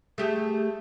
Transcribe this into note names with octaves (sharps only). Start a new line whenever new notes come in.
A3 G4 G#4